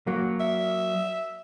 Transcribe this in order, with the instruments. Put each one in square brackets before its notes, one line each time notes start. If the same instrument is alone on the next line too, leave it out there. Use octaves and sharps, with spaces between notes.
[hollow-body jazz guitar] F#3 A#3
[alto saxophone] E5